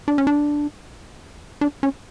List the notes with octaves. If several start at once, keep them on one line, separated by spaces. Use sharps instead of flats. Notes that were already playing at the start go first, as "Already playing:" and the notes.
D4
C#4
D4
D4
C#4